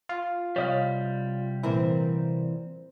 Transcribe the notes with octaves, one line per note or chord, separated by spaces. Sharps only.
F4
C2 G3 C#5 D#5 F5
A#2 E3 C4 A#4